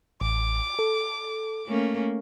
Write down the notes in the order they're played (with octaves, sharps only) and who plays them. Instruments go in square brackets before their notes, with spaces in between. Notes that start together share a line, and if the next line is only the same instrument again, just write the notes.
[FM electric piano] A1 [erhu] D6
[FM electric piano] A4
[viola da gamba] A3 A#3 C#4